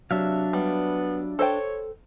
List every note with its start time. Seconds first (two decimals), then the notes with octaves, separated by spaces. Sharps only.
0.11 C3 F#3 D4 E5 F5
0.53 G3 B3
1.39 A4 C5 C#5 G5